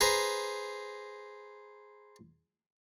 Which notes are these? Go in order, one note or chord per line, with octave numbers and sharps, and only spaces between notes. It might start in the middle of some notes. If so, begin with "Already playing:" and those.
G#4 B4 C5 A#5